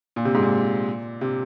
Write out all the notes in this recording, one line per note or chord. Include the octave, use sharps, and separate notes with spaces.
A#2
C3
G#2
A#2
C3